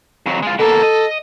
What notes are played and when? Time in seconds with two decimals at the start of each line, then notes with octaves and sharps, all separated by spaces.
0.26 F2 F#3
0.43 G#3 F4
0.59 B2 A#3 A4
0.83 D#5